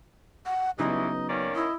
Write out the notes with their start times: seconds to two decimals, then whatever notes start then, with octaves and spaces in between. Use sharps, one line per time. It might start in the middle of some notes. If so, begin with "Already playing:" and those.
0.46 F#5
0.79 G2 C#3 E3 F#3 B3 D#4 D#5
1.29 D#3 A#3 C#4 D5
1.55 E4 D#5